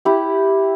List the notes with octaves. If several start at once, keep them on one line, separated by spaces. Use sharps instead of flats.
E4 G4